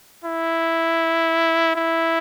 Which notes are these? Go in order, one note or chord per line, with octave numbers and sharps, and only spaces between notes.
E4
E4